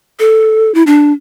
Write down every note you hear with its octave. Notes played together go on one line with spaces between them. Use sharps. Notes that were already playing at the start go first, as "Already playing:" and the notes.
A4
E4
D4